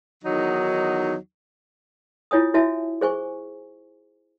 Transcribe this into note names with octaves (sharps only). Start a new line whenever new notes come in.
E2 D#3 F#3 D#4
E4 F4 C#5 G#5 D#6
E4 F#4 C#5 E5 G#5 A5
G#4 C5 G#5 C#6